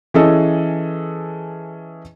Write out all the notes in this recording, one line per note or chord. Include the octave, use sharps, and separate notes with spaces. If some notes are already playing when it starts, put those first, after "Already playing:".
E3 C#4 G#4 A4 D#5